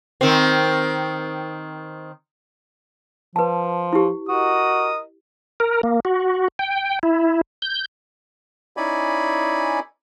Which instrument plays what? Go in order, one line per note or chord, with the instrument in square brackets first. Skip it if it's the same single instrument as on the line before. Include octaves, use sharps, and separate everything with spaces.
[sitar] D#3 C4
[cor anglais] F3 [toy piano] B4 A5
[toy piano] E4 G4
[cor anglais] F#4 [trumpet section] A#4 D#5 D#6
[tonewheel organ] A#4
A#3
F#4
G5
E4
G6
[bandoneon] C#4 D#4 E4 D5 G#5 B5